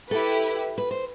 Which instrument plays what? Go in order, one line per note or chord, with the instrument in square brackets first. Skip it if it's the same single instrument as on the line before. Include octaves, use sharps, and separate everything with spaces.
[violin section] E4 G4 B4 [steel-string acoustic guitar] A4
[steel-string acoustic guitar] B4
C5